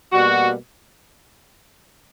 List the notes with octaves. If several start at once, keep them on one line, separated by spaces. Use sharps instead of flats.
B2 G3 A#3 F#4